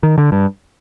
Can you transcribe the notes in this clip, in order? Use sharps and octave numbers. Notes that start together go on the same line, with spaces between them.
D#3
D3
G2